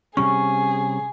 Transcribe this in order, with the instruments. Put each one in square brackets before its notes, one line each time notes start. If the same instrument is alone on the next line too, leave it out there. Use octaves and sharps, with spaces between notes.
[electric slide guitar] C3 G3 C#4 [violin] G#4 [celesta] C#6